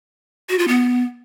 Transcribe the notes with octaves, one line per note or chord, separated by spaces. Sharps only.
F#4
F4
B3